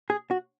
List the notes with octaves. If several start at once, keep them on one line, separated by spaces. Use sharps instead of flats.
G#4
F#4